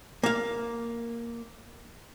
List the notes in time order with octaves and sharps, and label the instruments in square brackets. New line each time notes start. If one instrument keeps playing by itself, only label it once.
[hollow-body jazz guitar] A#3 F5